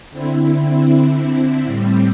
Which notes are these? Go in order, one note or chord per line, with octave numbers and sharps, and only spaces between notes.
D3 C4 E4
A2 G3 C4